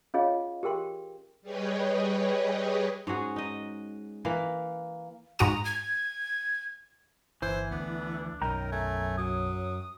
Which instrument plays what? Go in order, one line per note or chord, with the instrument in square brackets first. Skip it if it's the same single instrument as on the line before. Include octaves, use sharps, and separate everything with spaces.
[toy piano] C#4 F4 G#4 C#5 D#5 F5
G4 G#4 A#4 G5 C6
[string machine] G3 G4 G#4 B4 C#5 D#5
[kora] G#2 C#4 F#4 G#4
D#4 D#5
E3 A#3
[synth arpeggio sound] G#2 F#4 D#6 [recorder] A#5
[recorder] G#6
[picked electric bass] G1 [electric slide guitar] E3 [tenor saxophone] C5 [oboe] G#5
[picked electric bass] D2 [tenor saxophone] B3 [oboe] D4
[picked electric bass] B1 [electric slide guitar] F#2 G5 A#5 [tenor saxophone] D#3 [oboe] A#4
[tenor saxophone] A3 [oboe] G#5
[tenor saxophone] F#3 [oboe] D#6